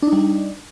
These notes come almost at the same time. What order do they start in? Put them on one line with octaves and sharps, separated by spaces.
D4 D#4 G3